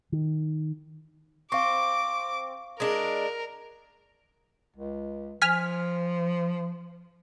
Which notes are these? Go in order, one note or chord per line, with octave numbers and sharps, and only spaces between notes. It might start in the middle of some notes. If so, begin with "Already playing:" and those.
D#3
C4 F5 C#6 D6
G#3 D4 A#4
C#2
F3 G#5 F6 B6